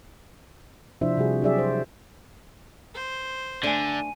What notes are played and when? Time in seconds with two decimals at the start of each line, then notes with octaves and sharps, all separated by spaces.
1.01 C3 F3 D4 E4 C5 E5
1.17 C3 G3 F#4 G#4
1.42 F#3 D4 G4 G#4 D5 E5
1.59 C5
2.95 C5
3.63 D3 A3 D4 G#5 D#7